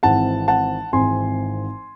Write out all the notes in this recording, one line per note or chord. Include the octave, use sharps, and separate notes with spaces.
G#1 G#2 E3 C4 F#5 A5
F#5 A5
G#1 G#2 E3 C4 G#5 C6